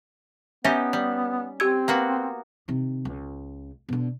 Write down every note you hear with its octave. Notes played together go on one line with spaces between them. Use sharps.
B3 C#4 D#4 G4 E5
G3
C4 G4 E6 G#6
A#3 B3 F#4
C3 D#3
C#2
B2 D3